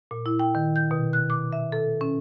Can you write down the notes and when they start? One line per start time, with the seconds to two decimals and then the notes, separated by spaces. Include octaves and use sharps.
0.11 A#2
0.26 E4
0.40 G5
0.55 D#3
0.76 G6
0.91 B2
1.13 F#6
1.30 D6
1.52 E5
1.72 A4
2.01 C#4